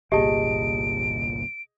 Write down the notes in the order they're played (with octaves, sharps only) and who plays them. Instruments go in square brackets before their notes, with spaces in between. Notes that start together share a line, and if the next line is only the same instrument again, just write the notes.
[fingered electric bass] G1 C2 A#2 [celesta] G4 A5 [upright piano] G#4 D#5 [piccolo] D7